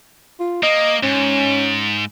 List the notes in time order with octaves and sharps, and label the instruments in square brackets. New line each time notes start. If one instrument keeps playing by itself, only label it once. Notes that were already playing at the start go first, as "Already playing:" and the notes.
[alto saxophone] F4
[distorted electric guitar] A#3 [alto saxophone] D#5
[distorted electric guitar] G#2 [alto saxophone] C#4